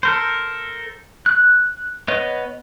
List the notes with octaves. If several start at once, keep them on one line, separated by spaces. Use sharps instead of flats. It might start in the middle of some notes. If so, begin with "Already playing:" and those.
A4 A#4 C5
F#6
B3 B4 C#5 D#5